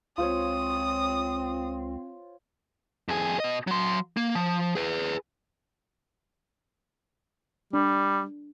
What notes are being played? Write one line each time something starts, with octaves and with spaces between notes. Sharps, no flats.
C#2 C4 F4 C5 C#5 D#6
F2 G#4
B2 D#5
F#3 C6
A#3
F3
G#4 B4
G3 D4